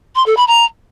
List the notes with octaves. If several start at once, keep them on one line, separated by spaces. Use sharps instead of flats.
C6
A4
B5
A#5